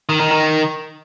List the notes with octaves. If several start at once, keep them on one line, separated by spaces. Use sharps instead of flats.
D#3
D#3
D#3